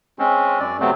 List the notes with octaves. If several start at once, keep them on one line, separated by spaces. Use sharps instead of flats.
G#3 C4 C#4
F#2 D5
C3 F#3 A3 B3 C4